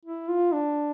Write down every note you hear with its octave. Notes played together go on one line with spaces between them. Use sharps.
E4
F4
D4